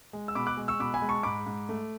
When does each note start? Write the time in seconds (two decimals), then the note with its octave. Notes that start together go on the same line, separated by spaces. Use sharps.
0.13 G#3
0.28 E6
0.35 B2 B5 D6
0.47 D6 F#6
0.57 G#3
0.68 C#6 E6
0.79 B2 B5 D6
0.94 G#5 B5
1.02 G#3
1.09 A5 C#6
1.23 G#2 B5 D6
1.46 G#2
1.69 A3